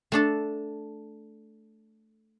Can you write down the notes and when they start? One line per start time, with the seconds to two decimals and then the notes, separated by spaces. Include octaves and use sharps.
0.12 A3 D4 A4